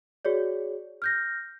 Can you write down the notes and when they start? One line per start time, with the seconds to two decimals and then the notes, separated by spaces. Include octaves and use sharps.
0.25 F#4 G#4 C#5 D5
1.02 F6 G6 A#6